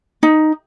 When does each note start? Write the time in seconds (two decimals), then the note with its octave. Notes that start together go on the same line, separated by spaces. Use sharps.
0.23 D#4